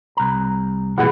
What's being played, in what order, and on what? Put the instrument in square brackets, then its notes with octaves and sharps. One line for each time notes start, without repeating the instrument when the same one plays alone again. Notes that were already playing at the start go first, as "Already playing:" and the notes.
[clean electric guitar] C2 A#5
[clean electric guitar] C2 A#2 E3 [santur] E4 G#4 F#5